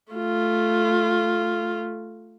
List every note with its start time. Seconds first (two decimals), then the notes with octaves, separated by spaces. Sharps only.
0.13 A3 F4